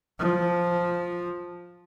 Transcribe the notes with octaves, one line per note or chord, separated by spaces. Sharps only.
F3